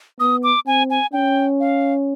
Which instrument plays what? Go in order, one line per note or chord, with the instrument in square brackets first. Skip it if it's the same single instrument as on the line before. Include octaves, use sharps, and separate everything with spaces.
[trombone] B3 [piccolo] D#6
[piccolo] D6
[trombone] C4 [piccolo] G#5
[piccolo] G#5
[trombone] C#4 [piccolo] G5
[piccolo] F5